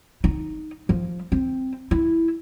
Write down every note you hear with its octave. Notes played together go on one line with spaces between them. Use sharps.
D#4
F3
C4
E4